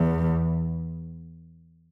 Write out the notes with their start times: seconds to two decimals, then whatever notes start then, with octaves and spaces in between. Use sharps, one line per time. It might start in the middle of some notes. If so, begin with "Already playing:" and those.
Already playing: E2